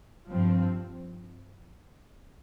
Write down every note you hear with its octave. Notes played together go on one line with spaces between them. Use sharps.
G2 F3 C4